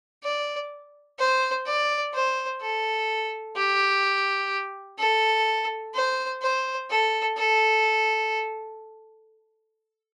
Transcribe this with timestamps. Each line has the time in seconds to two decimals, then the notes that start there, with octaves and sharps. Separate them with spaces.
0.23 D5
1.19 C5
1.66 D5
2.14 C5
2.61 A4
3.56 G4
4.99 A4
5.94 C5
6.42 C5
6.90 A4
7.37 A4